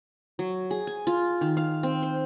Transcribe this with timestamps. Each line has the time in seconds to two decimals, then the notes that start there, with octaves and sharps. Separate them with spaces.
0.39 F#3
0.71 G#4
0.87 G#5
1.07 F4
1.41 D#3
1.57 F5
1.83 C4
2.03 C5